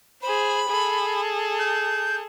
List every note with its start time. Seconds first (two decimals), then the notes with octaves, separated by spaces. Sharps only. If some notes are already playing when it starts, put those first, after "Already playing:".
0.22 G#4 C5 B5
0.68 G#4 A4
1.59 G6